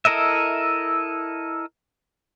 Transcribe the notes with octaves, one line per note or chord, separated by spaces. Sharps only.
E4 A4 A#4 D#5 E5